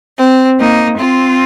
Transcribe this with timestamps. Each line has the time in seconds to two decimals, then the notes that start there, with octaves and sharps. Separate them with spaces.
0.18 C4
0.59 A#3 D#4
0.97 C4 F4